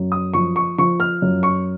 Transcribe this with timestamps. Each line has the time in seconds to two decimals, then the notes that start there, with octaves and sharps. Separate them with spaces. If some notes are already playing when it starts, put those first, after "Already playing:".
Already playing: F#2
0.12 D#6
0.34 F3 C#6
0.56 C#6
0.78 F3 C#6
1.00 F6
1.22 F#2
1.43 C#6